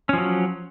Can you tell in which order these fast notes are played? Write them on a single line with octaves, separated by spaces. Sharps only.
C#4 F3 F#3